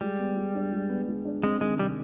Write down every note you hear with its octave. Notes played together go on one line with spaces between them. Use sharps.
G3 G#3
B3
G#3
D4
G#3
B3
G#3
D4
G#3 C4
D#3 G#3
C3 G3